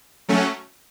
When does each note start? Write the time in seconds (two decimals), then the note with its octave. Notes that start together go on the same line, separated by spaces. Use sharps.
0.28 F#3 A3 C#4